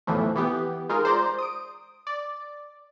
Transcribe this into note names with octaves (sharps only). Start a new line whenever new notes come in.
B1 F2 A2 E3 F3 A3
E3 B3 G4
G#3 D#4 F4 G#4 A#4
C5 D5 A#5
D#6 D7
D5